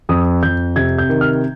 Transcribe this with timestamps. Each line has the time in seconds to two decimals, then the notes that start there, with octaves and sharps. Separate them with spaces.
0.09 F2 D#6
0.43 F2 G6
0.76 C3 G#6
0.99 G6
1.09 D#3
1.21 F6